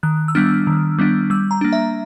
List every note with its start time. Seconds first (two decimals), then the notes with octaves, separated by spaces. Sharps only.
0.03 D#3 F#6
0.28 E6
0.35 G3 B3 D4 F6
0.67 D#3
0.99 G3 B3 D4
1.30 G3 E6
1.51 A#5
1.61 A#3 D4
1.73 E5